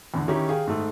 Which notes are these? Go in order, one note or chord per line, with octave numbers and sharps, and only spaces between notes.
E2 A2 D3
D#3 C#4 D#4 E4 G4
G#4 F5 G5
G#2 A3